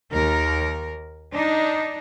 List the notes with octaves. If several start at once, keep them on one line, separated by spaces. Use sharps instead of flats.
D#2 A#4
D4 D#4